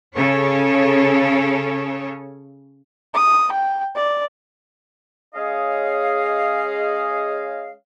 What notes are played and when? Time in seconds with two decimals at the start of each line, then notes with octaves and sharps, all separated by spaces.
0.15 C#3 A4 C#5
3.14 D#6
3.52 G5
3.96 D5
5.34 G#3 C#4 G#4 C#5 D#5 F5